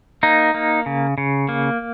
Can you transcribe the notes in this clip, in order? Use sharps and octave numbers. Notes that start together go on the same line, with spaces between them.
A#3 D#4
A#3
C#3
C#3
A#3